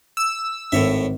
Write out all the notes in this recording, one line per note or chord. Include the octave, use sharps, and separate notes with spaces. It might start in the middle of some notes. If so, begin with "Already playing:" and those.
E6
G#1 A2 C#5 E5